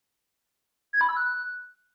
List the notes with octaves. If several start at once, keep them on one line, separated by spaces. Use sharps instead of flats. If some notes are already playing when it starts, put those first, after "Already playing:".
G#6
B5
E6
F#6